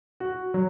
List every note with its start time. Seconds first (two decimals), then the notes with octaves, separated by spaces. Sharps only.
0.20 F#4
0.54 F#3